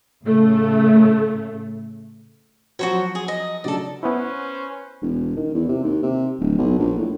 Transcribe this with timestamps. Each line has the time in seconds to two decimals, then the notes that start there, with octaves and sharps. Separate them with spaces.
0.24 A2 C#3 A3
2.79 F3 F#3 F#4 C5 C#5
3.15 G#4
3.28 D#5
3.64 C#3 F#3 D4 A4 D5
4.03 B3 C#4 E4 B4 C5
5.02 E1
5.36 D#3
5.54 E2
5.69 C3
5.84 D#2
6.03 C3
6.40 D1
6.58 B1
6.79 A#1
6.98 A2